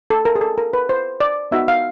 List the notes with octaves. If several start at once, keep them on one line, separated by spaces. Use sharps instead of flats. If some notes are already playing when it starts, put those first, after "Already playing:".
A4
A#4
G#4
A4
A#4
B4
C5
D5
B3 D#4 F#4 E5
F5